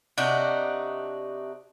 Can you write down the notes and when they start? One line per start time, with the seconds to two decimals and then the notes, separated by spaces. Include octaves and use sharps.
0.18 C3 D4 D#4 F#4